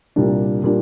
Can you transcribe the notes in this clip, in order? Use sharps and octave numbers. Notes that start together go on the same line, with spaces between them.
C2 A#2 G3 D4
A#2 G3 D4